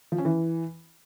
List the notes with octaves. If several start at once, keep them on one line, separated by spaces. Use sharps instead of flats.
F3
C#4
E3